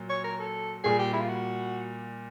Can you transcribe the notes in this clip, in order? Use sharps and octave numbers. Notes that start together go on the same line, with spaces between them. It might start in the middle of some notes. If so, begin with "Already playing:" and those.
Already playing: A#2 F#3
C#5
A#4
A4
A#2 G3 A#3 G#4
G4
E4
F4
F#4